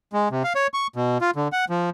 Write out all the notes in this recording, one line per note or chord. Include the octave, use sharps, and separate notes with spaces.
G#3
C3
F5
C#5
C#6
B2
F4
D3
F#5
F3